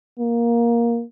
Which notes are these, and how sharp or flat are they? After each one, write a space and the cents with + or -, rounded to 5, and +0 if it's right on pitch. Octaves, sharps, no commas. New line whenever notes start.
A#3 +10